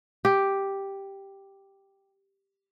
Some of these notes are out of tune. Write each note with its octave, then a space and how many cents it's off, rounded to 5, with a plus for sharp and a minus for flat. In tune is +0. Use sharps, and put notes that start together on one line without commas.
G4 +0